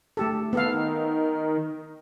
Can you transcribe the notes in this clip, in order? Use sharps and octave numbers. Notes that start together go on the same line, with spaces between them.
A3 G4 A4
D#3 B3 A4 F5